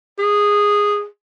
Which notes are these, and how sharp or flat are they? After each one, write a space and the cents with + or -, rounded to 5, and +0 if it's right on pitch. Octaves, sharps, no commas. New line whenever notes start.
G#4 -10